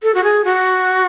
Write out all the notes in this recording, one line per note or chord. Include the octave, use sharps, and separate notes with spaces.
A4
F#4
G#4
F#4